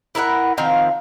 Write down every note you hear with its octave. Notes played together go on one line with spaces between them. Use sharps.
E4 A#4 E5 F#5
D#3 F3 C4 F5